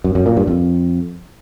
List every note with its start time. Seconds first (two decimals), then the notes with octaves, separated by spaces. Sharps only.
0.04 F#2
0.15 F#2
0.26 A#2
0.37 G2
0.47 F2